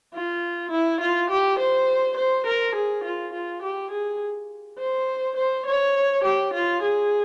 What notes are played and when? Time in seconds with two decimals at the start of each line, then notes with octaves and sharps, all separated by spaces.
0.14 F4
0.71 E4
1.01 F4
1.30 G4
1.59 C5
2.17 C5
2.47 A#4
2.75 G#4
3.04 F4
3.33 F4
3.62 G4
3.91 G#4
4.78 C5
5.36 C5
5.66 C#5
6.24 G4
6.53 F4
6.82 G#4